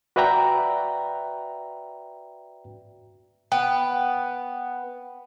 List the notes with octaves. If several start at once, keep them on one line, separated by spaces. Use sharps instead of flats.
F#4 B4 D5 E5 G5 A#5
B3 G5